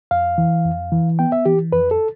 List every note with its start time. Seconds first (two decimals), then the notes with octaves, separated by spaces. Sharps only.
0.11 F2 F5
0.38 E3
0.65 F2
0.92 E3
1.19 B3 G5
1.32 E5
1.45 E3 G4
1.72 F2 B4
1.91 A4